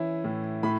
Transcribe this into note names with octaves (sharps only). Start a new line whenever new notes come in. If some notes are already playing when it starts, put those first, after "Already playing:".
Already playing: E3 C#4 E4
A2
A2 B5